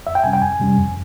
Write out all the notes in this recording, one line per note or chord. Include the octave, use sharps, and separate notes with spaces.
F2 E5
G5
C3 G3 C#4 G#5
G5
F2 G#5
C3 G3 C#4
F2